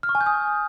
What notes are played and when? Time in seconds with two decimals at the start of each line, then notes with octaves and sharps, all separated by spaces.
0.03 F6
0.09 C#6
0.15 G#5
0.21 G6
0.26 D#6